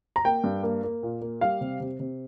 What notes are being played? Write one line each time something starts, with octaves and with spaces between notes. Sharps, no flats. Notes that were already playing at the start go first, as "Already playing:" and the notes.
A#5
A#3 G5
G2
A#3
A#3
A#2
A#3
G3 F5
C3
C3
C3